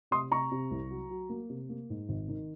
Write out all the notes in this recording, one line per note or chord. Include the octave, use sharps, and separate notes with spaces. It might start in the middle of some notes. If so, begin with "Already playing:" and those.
C3 C6 D#6
C3 A#5 C#6
C3
C2
F#3
F#3
A#3
C3
A#3
G#2
G#1
D#3